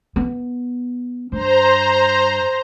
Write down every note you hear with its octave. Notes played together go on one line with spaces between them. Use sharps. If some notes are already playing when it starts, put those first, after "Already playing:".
B3
G2 C5 A#5